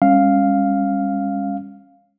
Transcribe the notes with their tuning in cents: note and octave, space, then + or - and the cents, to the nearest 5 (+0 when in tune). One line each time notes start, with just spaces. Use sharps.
G3 +40 C#4 -15 F5 +0